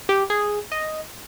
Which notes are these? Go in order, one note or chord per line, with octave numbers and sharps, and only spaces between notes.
G4
G#4
D#5